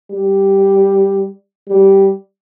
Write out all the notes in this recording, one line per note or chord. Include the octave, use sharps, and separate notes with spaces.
G3
G3